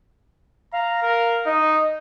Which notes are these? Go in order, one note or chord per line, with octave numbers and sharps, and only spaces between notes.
F5 A#5
A#4
D#4 D#5